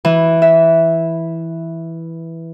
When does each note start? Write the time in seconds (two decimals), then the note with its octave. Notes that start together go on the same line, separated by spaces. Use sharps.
0.05 E3
0.42 E5